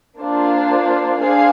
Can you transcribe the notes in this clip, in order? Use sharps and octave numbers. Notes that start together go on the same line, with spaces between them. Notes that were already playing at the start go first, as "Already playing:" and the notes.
A#3 D4 F4 C5
D4 G#4 C5 F5 G#5